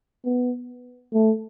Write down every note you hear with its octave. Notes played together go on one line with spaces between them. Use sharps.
B3
A3